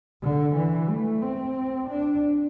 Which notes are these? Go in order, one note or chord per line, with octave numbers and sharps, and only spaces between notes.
D3
E3
A3
C4
D4